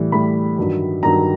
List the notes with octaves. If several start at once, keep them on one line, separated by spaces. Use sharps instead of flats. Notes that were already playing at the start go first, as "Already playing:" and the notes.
Already playing: A2 E3 G3
A2 E3 G3 B5
G2 D#3 F#3
G2 D#3 F#3 A#5